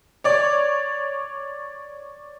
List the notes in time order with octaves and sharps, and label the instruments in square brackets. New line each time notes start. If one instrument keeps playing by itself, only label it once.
[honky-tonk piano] C#5 D5